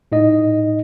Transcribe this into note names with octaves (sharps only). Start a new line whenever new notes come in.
A2 D#4 D#5